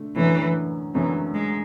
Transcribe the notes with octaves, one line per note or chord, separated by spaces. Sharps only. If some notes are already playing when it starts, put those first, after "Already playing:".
Already playing: D3 A3
F#2 D3 E3 F#3 A3
F#2 D3 E3 F#3 A3
G#3